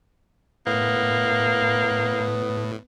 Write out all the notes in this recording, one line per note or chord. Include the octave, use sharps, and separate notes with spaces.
A2 A#3 B3